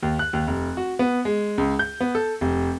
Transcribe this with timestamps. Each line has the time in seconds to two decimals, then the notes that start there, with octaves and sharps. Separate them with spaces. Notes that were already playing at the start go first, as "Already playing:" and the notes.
0.03 D#2
0.19 F#6
0.33 D#2
0.47 F1
0.77 F#4
0.99 B3
1.25 G#3
1.58 C#2
1.79 G6
2.00 B3
2.15 A4
2.41 F1